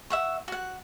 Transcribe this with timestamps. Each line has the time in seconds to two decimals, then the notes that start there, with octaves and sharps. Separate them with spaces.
0.10 E5 F#5 C#6
0.48 F#4 F#5